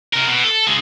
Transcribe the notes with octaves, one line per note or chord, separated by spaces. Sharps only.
C3 A#4
B2
A4
C#3 G#3